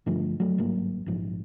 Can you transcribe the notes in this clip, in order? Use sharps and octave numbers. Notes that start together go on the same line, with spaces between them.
G2 D3 F3 A3
F#3 A3
G1 G#2 F#3 A#3
A#1 G#2 F3